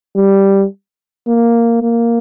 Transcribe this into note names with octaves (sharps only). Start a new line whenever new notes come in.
G3
A#3
A#3